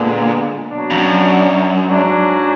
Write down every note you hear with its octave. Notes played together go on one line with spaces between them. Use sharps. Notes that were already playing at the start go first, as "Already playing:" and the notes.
Already playing: A#2 D3 G#3 B3 D4
B2 F#3 D4
F2
F#2
G#2 F#3 D4